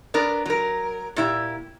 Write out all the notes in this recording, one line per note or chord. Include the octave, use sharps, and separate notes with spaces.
B3 D4 A#4
F#3 A#4
A#2 E4 G4